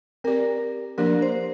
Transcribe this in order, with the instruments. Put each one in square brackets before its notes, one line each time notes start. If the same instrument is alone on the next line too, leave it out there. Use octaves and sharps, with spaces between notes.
[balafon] C4 G4 D5 [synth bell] A#4
[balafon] F3 A#3 D4 G4 D5 [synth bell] A#4
[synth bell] C5